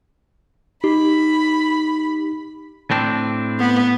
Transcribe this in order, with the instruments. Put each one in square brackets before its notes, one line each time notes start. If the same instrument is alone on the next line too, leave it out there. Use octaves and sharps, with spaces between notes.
[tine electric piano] D#4 [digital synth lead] G4 [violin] B5
[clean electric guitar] A2 C4 D4
[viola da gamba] B3